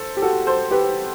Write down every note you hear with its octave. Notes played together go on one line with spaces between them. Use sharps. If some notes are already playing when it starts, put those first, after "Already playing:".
Already playing: A4 C5
G4
F#4 A4
A4 C5
G4 B4